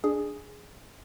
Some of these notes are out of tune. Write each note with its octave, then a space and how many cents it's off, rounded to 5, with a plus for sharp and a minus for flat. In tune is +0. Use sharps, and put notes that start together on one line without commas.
D4 +0 G#4 +0 D5 +35